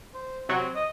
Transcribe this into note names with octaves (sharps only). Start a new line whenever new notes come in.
C5
C3 F#3 C4 F#4
D#5